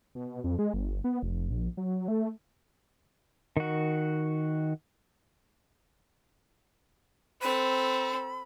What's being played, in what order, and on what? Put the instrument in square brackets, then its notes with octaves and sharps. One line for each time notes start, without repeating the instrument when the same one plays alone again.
[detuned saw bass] B2
F2
G#3
G1
B3
F1
A#1
F#3
A3
[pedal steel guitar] D#3 F#4
[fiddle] C4 A4 [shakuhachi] B5